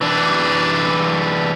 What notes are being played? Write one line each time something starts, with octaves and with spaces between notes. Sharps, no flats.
E3 D4